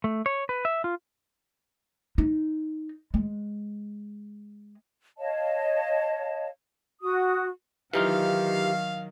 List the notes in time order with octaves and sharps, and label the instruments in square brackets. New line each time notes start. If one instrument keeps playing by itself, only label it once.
[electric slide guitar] A3
C#5
B4
E5
F4
[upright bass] D#4
G#3
[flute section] C#5 D#5 F5 A5
F#4 D#6
[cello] D#3 F#3 [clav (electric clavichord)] E3 D#4 F4 [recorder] G4 [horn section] F5